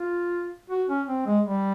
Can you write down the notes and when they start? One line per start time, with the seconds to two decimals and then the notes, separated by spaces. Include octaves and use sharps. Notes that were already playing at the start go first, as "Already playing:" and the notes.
Already playing: F4
0.70 F#4
0.89 C#4
1.08 C4
1.26 G#3
1.46 G3